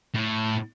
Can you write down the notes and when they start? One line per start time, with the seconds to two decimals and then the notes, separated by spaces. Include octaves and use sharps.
0.15 A2